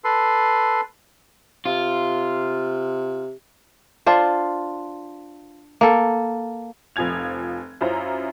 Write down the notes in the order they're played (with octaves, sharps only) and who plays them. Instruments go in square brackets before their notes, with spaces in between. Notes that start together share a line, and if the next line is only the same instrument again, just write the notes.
[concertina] A4 B4 C6
[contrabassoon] C3 [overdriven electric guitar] F4
[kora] D4 F4 C5
A#3 A4
[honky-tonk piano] F1 F3 G#5 G#6 F7
F#2 C#4 E4 F4 C5 A#5